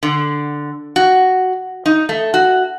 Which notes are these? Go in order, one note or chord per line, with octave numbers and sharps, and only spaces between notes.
D3
F#4
D#4
A3
F#4